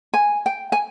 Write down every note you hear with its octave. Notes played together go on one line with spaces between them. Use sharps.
G#5
G5
G#5